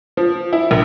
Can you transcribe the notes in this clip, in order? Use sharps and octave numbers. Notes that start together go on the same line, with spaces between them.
F3
E4
A#1